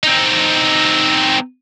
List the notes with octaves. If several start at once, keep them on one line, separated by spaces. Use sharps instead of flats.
C4 D#4